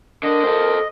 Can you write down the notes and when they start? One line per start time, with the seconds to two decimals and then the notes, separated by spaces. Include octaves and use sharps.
0.23 D3 D4 A#4 D#5
0.44 A4 C5